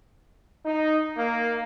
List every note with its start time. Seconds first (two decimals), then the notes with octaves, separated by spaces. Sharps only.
0.66 D#4
1.17 A#3